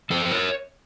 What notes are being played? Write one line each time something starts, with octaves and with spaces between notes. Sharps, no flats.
F3 A4 C5
C5
A#4 C#5